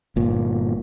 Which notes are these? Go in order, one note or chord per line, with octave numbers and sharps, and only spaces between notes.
G1 A#2